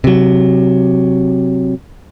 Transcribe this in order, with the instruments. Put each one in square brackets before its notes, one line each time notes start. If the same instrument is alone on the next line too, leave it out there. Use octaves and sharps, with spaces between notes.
[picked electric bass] C3 F#3